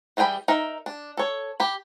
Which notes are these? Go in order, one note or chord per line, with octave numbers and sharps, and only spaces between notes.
E3 G3 G#4 G5 B5
D#4 A#4 E5
D4
A4 C#5
G4 B5